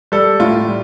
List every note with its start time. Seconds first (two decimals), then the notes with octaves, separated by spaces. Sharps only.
0.12 G3 A4
0.40 A2 F4
0.68 G3